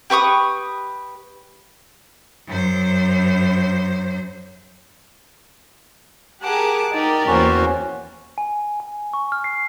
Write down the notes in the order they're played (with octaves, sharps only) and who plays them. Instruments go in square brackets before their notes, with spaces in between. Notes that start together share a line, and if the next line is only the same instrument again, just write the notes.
[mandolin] G4 B4 C#6 D#6
[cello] F#2 C5
[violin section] G4 G#4 A#4 [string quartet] F#5 A5 D6
[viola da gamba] D#4 [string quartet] G4 D5 [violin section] A#4
[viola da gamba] E2 A#3 C5 [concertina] C#4 F#4
[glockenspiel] G#5
G#5
C#6
F6
C7